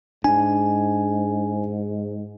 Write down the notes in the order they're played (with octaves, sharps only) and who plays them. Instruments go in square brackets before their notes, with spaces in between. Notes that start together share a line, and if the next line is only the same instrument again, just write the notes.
[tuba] G#2 [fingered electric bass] D4 [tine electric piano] G#5